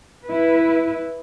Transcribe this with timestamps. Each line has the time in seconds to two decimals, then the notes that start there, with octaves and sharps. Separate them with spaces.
0.25 E4 B4